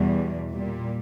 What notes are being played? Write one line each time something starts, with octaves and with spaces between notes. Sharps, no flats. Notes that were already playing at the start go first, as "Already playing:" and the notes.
Already playing: E2 B2 G3
A#2 G3